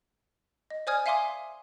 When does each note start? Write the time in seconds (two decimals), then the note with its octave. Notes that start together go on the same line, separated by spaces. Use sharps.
0.70 D#5
0.87 C5 D5 G#5 D#6 F6 G#6
1.06 E5 F5 G#5 C6 D6 D#6